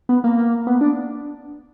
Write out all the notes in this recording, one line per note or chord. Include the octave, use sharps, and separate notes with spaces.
B3
A#3
B3
D4